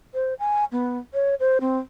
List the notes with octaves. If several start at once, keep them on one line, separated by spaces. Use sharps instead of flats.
C5
G#5
B3
C#5
C5
C4